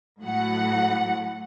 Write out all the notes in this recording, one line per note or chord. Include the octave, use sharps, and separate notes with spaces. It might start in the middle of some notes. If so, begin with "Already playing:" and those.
A2 F#3 F#5